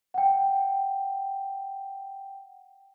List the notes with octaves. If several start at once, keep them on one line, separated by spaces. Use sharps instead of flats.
F#5 G5